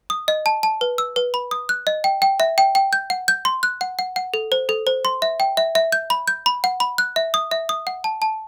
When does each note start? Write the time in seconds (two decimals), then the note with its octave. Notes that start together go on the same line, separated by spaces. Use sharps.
0.10 D#6
0.28 D#5
0.46 A5
0.63 A5
0.81 B4
0.98 E6
1.16 B4
1.34 B5
1.51 D#6
1.69 F#6
1.87 D#5
2.04 G5
2.22 G5
2.40 E5
2.58 G5
2.75 G5
2.93 G6
3.10 F#5
3.28 G6
3.45 C6
3.63 F#6
3.81 F#5
3.99 F#5
4.16 F#5
4.34 A4
4.52 C5
4.69 A4
4.87 C5
5.05 C6
5.22 E5
5.40 G5
5.57 E5
5.75 E5
5.92 G6
6.10 B5
6.28 G6
6.46 B5
6.64 F#5
6.80 B5
6.98 F#6
7.16 E5
7.34 D#6
7.51 E5
7.69 D#6
7.87 F#5
8.04 A5
8.22 A5